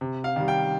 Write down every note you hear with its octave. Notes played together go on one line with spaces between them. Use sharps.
C3
F5
D#3 G3
G5